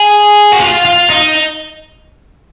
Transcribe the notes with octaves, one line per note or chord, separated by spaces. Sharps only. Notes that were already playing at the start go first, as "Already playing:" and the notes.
Already playing: G#4
F#4
F4
F4
D#4